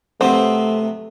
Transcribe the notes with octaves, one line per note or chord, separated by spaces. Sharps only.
C3 F#3 A3 B3 C4